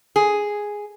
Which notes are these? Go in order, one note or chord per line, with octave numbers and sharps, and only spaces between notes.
G#4